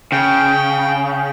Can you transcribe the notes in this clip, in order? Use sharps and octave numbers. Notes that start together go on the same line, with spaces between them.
C#3 G5